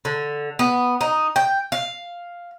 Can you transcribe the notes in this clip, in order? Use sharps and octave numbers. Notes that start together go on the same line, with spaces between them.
D3
B3
D#4
G5
F5